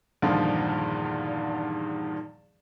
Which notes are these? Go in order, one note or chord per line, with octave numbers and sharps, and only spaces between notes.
E2 G2 A#2 D3 D#3 F3